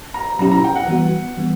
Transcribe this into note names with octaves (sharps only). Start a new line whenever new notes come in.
A#5
B2 F#3 C#4 E4 G4 A#5
A#5
G5
F#5
E3 G3 B3 F#4
E3 G3 B3